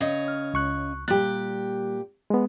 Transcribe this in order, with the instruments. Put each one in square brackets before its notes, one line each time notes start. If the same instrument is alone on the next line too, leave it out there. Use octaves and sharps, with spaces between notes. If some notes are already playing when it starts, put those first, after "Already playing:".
[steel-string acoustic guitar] C#3 C#5 D#5
[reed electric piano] F6
C#2 C#6 F#6
[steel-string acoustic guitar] A#2 G4 [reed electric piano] G3 F#6
[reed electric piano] G#3 B3